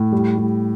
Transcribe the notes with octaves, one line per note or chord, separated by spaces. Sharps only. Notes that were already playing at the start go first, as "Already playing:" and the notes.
Already playing: A2
G3
G3